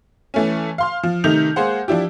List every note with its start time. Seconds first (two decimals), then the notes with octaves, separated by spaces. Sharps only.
0.34 E3 A3 C#4
0.78 F5 C6 F6
1.03 F3
1.24 C3 D#3 A3 D#4 G6 F7
1.56 G#3 A#3 G#4 C5 F#5
1.88 F3 D4 E4 G4